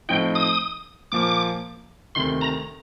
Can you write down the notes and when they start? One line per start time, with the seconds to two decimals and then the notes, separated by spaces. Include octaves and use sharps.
0.09 A2 F3 C4 D#4 G5
0.35 D#6
1.12 A#2 F3 A#3 D6
2.15 D2 C3 D#3 C6
2.41 A#5